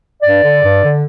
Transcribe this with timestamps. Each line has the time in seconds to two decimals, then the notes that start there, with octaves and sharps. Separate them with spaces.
0.23 G2 D5
0.43 D3
0.63 G2
0.83 D3